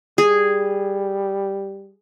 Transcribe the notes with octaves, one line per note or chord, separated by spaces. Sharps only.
G3 G#4